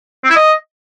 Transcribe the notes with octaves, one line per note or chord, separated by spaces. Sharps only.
C4
E4
D#5